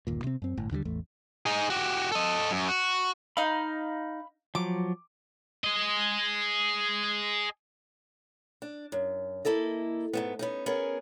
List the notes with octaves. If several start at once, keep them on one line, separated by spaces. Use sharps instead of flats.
G1 D#2 A#2
C3 C4
F#2 C4
G1 A2
D#2 D3 F3 G3
A1 E2 A3
D#4 G#4
F#4 G4
A4 D#5
F#2
F#4
D#4 F5 B5
F3 F#3 D6
G#4 D#5
D4
F#2
A#3 E4 A4 D#5
G#2 A3 B3
B3 C#4 D#4
B3 C#4 G#4 A#4